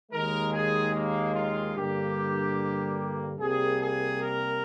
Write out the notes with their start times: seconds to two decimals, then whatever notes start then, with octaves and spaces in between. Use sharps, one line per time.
0.11 D#2 D#3 G#3 A#4
0.52 G#4
0.93 A#3
1.34 F4
1.75 G2 D3 G3 A#3 G4
3.39 C2 C3 G3 A#3 G#4
3.79 G#4
4.21 A#4